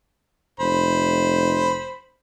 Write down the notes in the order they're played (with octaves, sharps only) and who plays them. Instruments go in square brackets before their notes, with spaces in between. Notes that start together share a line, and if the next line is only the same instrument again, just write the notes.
[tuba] F1 [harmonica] C5 B5